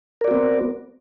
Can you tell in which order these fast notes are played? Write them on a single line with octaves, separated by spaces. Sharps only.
A#4 D5 F#4 C4 B3